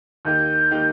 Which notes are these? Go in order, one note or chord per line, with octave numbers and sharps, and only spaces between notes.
D#2 D#3 A#3 D#4 G4 G6
D#3 A#3 D#4 G4